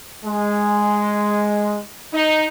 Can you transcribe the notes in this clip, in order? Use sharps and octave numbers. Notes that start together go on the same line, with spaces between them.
G#3
D#4